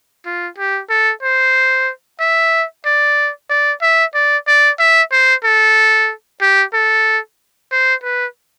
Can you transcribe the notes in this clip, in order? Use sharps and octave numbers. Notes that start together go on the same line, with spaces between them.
F4
G4
A4
C5
E5
D5
D5
E5
D5
D5
E5
C5
A4
G4
A4
C5
B4